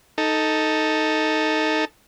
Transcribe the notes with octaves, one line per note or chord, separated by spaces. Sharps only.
D#4 A4